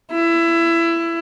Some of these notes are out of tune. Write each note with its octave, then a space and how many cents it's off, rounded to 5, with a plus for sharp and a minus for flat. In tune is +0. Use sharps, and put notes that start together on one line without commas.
E4 +20